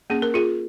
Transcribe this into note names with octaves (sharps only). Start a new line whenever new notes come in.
A#3 C#4 G#4
A#4
F4 G#4